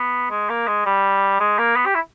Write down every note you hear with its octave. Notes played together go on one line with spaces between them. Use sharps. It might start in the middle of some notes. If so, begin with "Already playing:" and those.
Already playing: B3
G#3
A#3
G#3
G3
G#3
A#3
B3
G4
E4